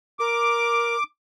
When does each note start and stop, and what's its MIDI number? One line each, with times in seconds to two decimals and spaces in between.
0.20 0.96 70
0.20 1.03 86